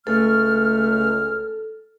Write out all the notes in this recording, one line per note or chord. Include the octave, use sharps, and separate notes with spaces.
C#2 A3 A4 F6